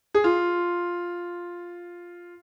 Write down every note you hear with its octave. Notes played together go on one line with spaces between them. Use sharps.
G#4
F4